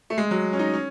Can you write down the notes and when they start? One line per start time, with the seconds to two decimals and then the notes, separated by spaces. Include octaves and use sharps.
0.10 A3
0.18 G#3
0.31 F#3
0.53 C#4
0.59 D#4
0.74 C#4